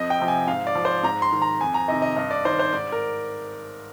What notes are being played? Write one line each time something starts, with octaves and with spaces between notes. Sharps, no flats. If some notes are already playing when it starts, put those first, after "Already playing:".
Already playing: F2 D#5
G5
C3 F3
G#5
G#2 F5
D5
F3
C5
G#2 A#5
C6
D#3
A#5
F2 G#5
A#5
C3 D#3 D#5
D#5
G2 D#5
D5
D#3 C5
C5
G#2 D5
A#4